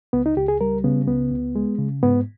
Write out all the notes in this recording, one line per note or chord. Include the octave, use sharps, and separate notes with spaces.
C#2 B3
D#4
C#2 G4
G#4
G3 A#4
C#3 B3
C#2 B3
C#2
G#3
C#3
G#2 B3